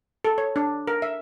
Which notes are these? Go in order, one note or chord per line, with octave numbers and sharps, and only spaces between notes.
A4
C#5
D4
A#4
E5